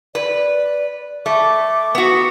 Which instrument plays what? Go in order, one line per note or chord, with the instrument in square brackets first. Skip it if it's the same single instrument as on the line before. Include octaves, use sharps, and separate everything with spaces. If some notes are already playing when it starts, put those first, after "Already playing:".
[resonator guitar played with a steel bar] B4 [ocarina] D5
[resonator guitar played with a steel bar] A3 [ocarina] D6
[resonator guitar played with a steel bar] B3 F#4